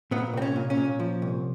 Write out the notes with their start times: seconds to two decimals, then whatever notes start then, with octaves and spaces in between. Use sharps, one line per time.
0.11 A#2 B3
0.33 C2 C4
0.42 C#4
0.56 A#2
0.70 C#4
0.78 A#2
1.00 F3
1.22 C2